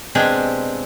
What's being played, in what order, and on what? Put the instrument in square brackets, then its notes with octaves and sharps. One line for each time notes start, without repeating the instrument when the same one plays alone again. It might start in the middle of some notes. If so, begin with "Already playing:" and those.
[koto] B2 G#3 C4 D4 G4 G#5